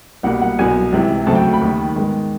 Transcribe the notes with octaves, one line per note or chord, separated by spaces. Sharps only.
C2 B2 G3 A#3 F#5
F#5
C2 B2 F#3 G#5
C#2 C3 E3
D2 C#3 F#3 A3 C4 A5
G5
B5
D#2 D#3 G3
G#2 D#3 G#3 B3